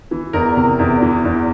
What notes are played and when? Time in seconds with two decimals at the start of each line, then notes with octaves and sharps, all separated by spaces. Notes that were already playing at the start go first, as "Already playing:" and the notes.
0.11 E3
0.33 E2 A#4
0.56 C3
0.79 E2
1.02 E3
1.24 E2